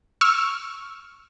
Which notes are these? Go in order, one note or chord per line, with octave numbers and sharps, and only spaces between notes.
C#6 E6 F6